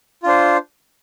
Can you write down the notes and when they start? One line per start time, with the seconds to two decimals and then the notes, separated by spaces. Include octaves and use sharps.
0.23 F4
0.26 D4
0.29 C5